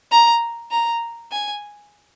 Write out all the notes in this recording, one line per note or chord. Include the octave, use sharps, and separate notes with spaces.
A#5
A#5
G#5